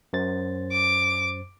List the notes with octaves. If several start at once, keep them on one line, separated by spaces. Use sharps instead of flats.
F#2 C5 A6
D6